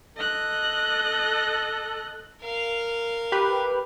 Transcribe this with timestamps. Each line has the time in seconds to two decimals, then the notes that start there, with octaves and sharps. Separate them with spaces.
0.16 A4 D#5 F#6
2.42 A#4 F5
3.32 G4 B4